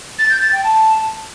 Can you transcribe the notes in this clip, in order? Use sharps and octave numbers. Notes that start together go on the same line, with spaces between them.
A6
G6
A6
G5
A5